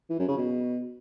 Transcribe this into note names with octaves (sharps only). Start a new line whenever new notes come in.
E3
F#2
C#3
B2